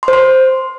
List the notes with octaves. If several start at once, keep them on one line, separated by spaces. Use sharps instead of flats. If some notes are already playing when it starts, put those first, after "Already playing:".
C6
C5
C6